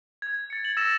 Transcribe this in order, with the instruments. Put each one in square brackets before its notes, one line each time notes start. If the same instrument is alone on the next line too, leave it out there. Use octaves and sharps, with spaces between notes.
[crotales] G#6
A6 C#7
F#7
E6 A6 A#6 E7